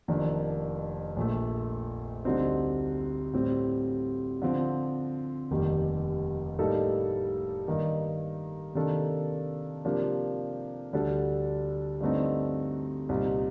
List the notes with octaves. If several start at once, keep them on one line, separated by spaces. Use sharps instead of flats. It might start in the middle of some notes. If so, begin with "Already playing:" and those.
F1 F2 D#3 A#3 D4
A#1 A#2 A3
D2 D3 G3 C4 D#4
A2 G3 C4
D3 F3 C4
F1 D#2 D#3 G3
A2 G3 A#3 D#4 A4
G2 D#3 A#3 D#4
C3 D#3 A#3 D4 A4
C3 F3 A#3 D4 G4
D2 D3 G3 D4 A4
G2 D3 A3 C4 D#4
C2 A#2 G3 C4 D#4